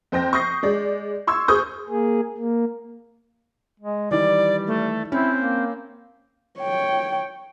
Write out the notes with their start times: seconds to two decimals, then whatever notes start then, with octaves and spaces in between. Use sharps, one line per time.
0.12 F2 C5 G5 A#6
0.33 C#6 D#6 G6 A#6 C7
0.63 G#3 D5
1.27 C6 C#6 E6 G#6
1.48 G#4 C5 C#6 D#6 G6
1.89 A#3 G#4
2.38 A#3
3.80 G#3
4.11 D#3 E3 G3 D5
4.67 A3
5.12 C4 C#4 E4
5.37 A#3
6.60 C#5 G5